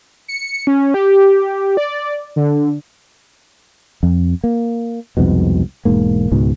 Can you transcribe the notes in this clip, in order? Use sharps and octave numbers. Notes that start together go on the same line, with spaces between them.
C#7
C#4
G4
D5
D3
F2
A#3
C2 F2 G#2 B2
E1 G#2 A#3
C#2 G#2 B2